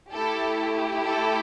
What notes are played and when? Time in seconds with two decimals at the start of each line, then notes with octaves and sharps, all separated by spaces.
0.14 A3 E4 G4 A4
1.07 A4